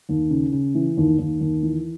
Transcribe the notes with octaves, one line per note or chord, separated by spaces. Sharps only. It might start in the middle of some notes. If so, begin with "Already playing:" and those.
D#2
C#3
C#3
E3
D#2
D#2
D#2
E3